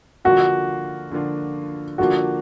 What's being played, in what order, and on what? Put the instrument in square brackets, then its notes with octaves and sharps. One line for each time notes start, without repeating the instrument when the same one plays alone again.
[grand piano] D3 F3 A#3 D4 F4 [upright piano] F#4
[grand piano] D3 F3 A#3 D4 F4
[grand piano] D3 F3 A#3 D4 F4 [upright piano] F#4